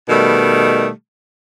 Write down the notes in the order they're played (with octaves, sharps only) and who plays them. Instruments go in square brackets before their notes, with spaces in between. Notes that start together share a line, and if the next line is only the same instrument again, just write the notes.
[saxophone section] B2 D#3 G3 A3